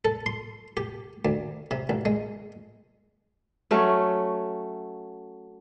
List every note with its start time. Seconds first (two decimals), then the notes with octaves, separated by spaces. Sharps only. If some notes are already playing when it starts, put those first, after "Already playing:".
0.05 A4
0.26 C6
0.77 G4
1.25 D2
1.71 C3
1.89 A1
2.05 G#3
3.71 F#3 A3 C#4